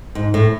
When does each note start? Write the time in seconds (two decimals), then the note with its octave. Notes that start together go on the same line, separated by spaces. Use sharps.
0.15 G#2
0.34 A2